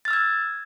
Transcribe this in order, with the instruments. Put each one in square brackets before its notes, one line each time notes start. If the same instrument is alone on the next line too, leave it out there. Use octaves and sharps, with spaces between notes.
[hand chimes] A6
F6
E6
G#6